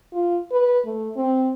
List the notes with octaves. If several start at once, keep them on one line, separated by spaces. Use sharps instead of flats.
F4
B4
A3
C4